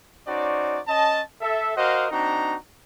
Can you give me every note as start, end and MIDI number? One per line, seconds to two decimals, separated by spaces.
0.27 0.79 61
0.27 0.79 63
0.27 0.79 66
0.27 0.79 72
0.27 0.79 74
0.87 1.20 61
0.87 1.20 75
0.87 1.20 81
1.41 1.71 69
1.41 1.71 76
1.77 2.07 66
1.77 2.07 70
1.77 2.07 72
1.77 2.07 75
1.77 2.07 77
1.77 2.07 78
2.11 2.56 60
2.11 2.56 62
2.11 2.56 63
2.11 2.56 66
2.11 2.56 82